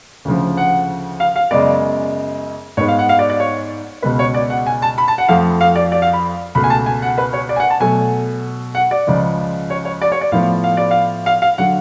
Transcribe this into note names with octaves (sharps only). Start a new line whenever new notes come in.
D2 C#3 F3
F#5
F5
F5
F#2 C#3 G#3 B3 D5
G#2 G#3 B3 C#5
F5
F#5
F5
D5
D5
C#5
C#2 B2 G#3 B3 B4
C#5
D5
F#5
G#5
A5
B5
A5
F#5
F2 F3 A3 F5
F5
D5
D5
F5
B5
C#2 B2 A3 B5
G#5
A5
G#5
F#5
B4
C#5
D5
G#5
F#5
A5
B2 F#3 A3 G#5
F#5
D5
C#2 C#3 F3 G#3
C#5
C#5
D5
C#5
D5
A2 F3 B3 F5
F5
F5
D5
F5
F5
F5
D3 F#3 F#5